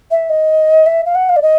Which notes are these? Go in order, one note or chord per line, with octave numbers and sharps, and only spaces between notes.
E5
D#5
E5
F5
F#5
F5
D5
D#5